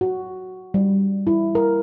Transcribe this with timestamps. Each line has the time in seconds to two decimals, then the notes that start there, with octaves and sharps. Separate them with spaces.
0.01 F#4
0.74 G3
1.27 E4
1.55 A#4